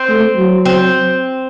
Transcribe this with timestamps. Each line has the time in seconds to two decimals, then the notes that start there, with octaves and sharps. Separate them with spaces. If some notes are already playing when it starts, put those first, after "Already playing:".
Already playing: C4
0.09 A3
0.37 F#3
0.65 C4